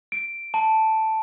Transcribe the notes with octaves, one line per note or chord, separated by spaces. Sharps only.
D7
A5